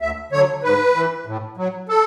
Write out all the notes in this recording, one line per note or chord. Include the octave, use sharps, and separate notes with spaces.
D2 E5
D3 F#3 C#5
G#2 B4
E3
A2
F#3
A4